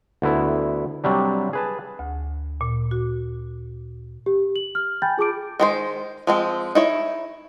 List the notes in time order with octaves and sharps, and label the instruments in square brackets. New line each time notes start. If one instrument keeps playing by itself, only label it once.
[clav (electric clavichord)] D2 B3 E4
C3 F#3 G3 D4
G#4 B4 A5
[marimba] D2
A#2
F#4
[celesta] G4
F#7
F6
G5 G#5 B5 G6 A6
F4 G#4 A5 D6 D7
[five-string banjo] D#3 G#3 C5
F3 G#3 C4
D#4 E4 C#5